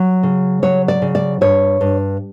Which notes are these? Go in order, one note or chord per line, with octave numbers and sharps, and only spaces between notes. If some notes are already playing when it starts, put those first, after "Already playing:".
Already playing: F#3
C#3
F#3 C#5
D5
C#3
D5
G2 C#5
G2